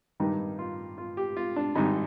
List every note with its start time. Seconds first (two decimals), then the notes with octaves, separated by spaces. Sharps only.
0.20 G2 D#3 G3 D#4
0.59 F4
0.98 F4
1.17 G4
1.37 F4
1.56 D4
1.75 G#1 G#2 G3 D#4